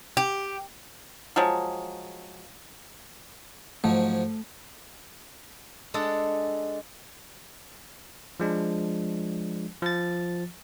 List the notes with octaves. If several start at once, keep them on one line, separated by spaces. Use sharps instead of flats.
G4
F3 F#3 G#3
G#2 F3 F#3 A3
G#3 D4 A4 D#5 F#5
F3 G#3 D4
F3 A6